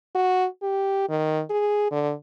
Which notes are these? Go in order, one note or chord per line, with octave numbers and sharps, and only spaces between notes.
F#4
G4
D#3
G#4
D3